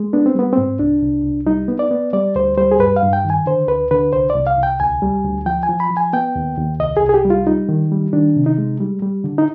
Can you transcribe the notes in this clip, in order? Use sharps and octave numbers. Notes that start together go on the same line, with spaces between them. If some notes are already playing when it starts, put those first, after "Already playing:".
Already playing: G#3
B3 D4
C4
G3 B3
C4
G#2
C2 D4
C2
C2
G3 D#4
B3
D5
B3
G3 D5
D2 C5
G3 C5
G#4
G2 B4
F5
G2
G5
D#3
G#5
D3 C5
D2 B4
D3 B4
C2 C5
D5
C2
F5
C2
G5
D2 G#5
G3
D2
F3 G5
G#5
F3
B5
F3
G#5
B3 G5
D#2
D#2
C2 D#5
G#4
C2
G#4
G4
G3
F4
G3 D#4
D#3
G3
D#3 D4
C3
D#4
G#3
G3
G3
D3
D#4